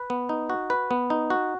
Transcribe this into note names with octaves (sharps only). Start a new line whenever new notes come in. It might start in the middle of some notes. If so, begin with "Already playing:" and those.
Already playing: B4
B3
D#4
F#4
B4
B3
D#4
F#4